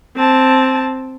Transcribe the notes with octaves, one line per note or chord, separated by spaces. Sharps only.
C4 A5